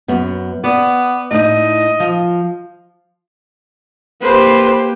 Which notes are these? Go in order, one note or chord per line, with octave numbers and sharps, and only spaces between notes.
F#2 B3
B3 D5
A2 D#4 D#5
F3
A#3 G4 B4 C5